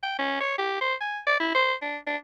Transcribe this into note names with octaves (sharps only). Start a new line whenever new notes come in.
G5
C#4
C#5
G4
C5
G#5
D5
E4
C5
D4
D4